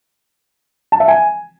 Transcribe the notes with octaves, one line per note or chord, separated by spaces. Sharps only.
A5
E5
G#5